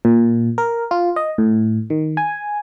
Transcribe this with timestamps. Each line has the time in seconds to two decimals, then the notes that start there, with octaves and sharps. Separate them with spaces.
0.05 A#2
0.58 A#4
0.91 F4
1.16 D#5
1.38 A2
1.90 D#3
2.17 G#5